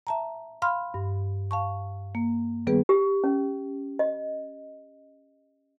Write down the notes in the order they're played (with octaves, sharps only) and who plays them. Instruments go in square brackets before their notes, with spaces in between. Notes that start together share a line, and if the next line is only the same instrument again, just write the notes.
[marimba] E5 A5 A#5
F5 B5 C6 F6
G2
F5 A5 C#6
A#3
D#3 G3 B3 G#4 B4
[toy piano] G4
C#4
D#5